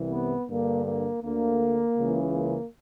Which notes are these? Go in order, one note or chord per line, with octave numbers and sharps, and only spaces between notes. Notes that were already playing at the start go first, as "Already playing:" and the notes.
Already playing: C2 C3 E3
B3
G2 D3 A#3
A#3
D2 D3 A#3
C#2 C#3 E3
A#3